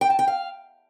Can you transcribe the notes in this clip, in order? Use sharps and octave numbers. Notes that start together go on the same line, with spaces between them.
G5
A5
G5
F5